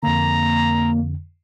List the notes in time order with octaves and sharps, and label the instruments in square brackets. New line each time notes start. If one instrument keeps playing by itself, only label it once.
[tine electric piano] F2 D3 [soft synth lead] A#3 [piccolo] A#5